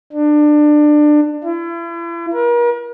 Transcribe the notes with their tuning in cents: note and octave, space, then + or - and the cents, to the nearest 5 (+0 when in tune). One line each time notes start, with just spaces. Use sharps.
D4 +25
E4 +40
A#4 +40